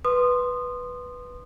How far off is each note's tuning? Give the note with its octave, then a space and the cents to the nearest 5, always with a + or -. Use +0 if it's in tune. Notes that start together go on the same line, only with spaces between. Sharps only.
B4 +0 C6 +0 D#6 -20